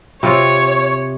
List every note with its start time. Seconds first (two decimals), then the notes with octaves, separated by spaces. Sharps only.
0.23 C3 F4 C#5